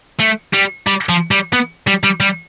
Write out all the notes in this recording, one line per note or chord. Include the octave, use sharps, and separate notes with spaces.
A3
G3
G3
F3
G3
B3
G3
G3
G3